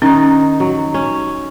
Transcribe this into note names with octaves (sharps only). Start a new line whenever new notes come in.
D#3 C#4 D#4
F#3
C#4